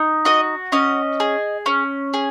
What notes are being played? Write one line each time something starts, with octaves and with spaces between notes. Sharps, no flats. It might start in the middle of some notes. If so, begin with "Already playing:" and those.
Already playing: D#4
F#4 D#5
C#4 D#5
G#4
C#4
G#4